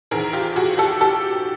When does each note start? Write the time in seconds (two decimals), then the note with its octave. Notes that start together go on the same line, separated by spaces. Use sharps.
0.11 E2 C3 D#3 G#4 A#4
0.33 F4 G4
0.56 F#4 G#4
0.78 G4 A4
1.01 G4 A4